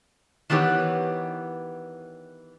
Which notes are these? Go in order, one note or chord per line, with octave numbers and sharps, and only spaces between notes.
D#3 E3 B3 G4 C#5